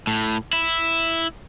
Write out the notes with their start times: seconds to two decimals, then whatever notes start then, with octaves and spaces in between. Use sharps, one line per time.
0.07 A2
0.53 E4